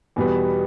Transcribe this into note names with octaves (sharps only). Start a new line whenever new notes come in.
E2 B2 G3 B3